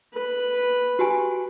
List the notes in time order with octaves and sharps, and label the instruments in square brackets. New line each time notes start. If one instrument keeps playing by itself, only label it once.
[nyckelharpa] B4
[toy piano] F#4 G4 G#5